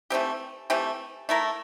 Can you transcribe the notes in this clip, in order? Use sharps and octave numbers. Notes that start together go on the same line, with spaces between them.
E3 A3 C4 G4
E3 A3 C4 G4
A3 E4 A#4